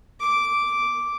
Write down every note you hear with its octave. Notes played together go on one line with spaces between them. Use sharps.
D6